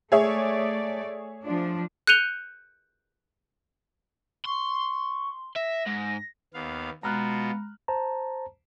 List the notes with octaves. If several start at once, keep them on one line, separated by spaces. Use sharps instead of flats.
A3 G#4 C#5 D5 E5
F3 D4
F#6 G6 C#7 D#7 F7 G7
C6 C#6
E5 A#6
G#2
D#2 B3 F5
B2 G#3 F4 F#4 A#5 B5 F6 F#6
C5 A5 A#5